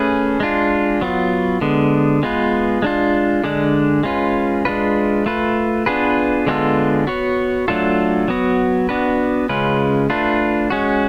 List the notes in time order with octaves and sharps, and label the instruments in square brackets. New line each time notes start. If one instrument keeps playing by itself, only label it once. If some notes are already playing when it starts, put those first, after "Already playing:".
Already playing: [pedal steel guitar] A3 C#4 G#4 B4
G#3 D4 F4
F#3 B3 F4
D3 G#3 B3
G#3 B3 F4 B4
G#3 D4 F4
D3 G#3 D4
G#3 C#4 F4 B4
G#3 D4 F4 B4
A3 F4 B4
B3 D4 F4 G#4 B4
D3 G#3 B3 F4 A4
B3 F#4 C#5
F#3 A3 D4 F4 A4
F#3 B3 F#4
B3 D4 F#4 B4
C#3 G#3 C#4 F4 B4
A3 D4 F4 B4
G#3 C#4 F#4